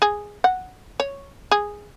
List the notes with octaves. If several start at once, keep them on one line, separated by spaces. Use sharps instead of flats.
G#4
F#5
C#5
G#4